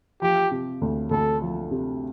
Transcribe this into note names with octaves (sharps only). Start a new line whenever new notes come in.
F3 G4
C3
D2
D2 A4
F3
C3